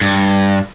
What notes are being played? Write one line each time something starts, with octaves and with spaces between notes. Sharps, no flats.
G2